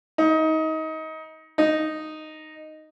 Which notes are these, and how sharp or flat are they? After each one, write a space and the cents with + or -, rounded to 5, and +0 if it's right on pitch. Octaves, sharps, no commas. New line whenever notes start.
D#4 +25
D#4 -5